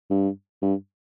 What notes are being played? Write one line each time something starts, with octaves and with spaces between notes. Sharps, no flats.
G2
G2